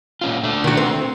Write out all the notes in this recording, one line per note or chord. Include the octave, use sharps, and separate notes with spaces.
A#2 C#4 F4
A3 D4
D#3 F#4
C4